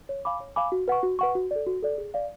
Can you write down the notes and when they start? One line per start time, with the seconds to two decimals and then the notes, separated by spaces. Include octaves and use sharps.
0.09 C#5
0.25 F5 G#5 B5 D6
0.40 C#5
0.56 F5 G#5 B5 D6
0.72 F#4
0.88 B4 F#5 C#6
1.03 F#4
1.19 B4 F#5 C#6
1.35 F#4
1.51 A4 D5
1.66 F#4
1.82 A4 D5
1.98 G#4
2.14 D5 F5